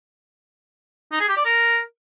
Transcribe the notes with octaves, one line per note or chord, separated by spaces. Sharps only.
D#4
G#4
G4
D5
A#4